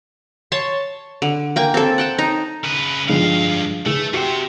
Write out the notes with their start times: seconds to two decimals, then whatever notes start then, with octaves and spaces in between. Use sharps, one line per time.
0.52 C#5 A5 C6
1.22 D3
1.56 A#3 G5 G#5
1.74 C4 A4
1.98 F#5 G5 A5
2.18 D#4
2.64 C#3 B4
3.09 G2 D3 F3 G#3 F5
3.86 E3 A3 G#4
4.14 C3 F#4 G4 C5 C#7